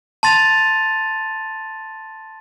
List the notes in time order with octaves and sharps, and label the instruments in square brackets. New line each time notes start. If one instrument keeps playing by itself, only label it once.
[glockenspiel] A5 C6 A6 D#7 F7